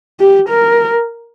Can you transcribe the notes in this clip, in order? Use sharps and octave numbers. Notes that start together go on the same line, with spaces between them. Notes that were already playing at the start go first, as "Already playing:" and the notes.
G4
A#4